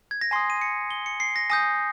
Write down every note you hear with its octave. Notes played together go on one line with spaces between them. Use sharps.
G#6
A#6
G#5 C6 D#6 C7
D#7
C#7
G7
C#7
C7
A#6
G#5 D#6 G6 A#6